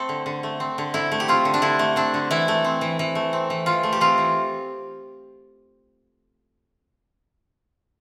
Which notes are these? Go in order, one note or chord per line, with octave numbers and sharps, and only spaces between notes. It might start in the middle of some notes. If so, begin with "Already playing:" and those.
Already playing: A3 C4 A4
D3
D3
A3
C4
D3
D3 E4
A3
G4
C4 F4
D3
D4
D3 E4
A3
C4 D4
D3
E3 E4
A3
C4
E3
E3
A3
C4
E3
E3 F4
A3
G4
C4 F4
E3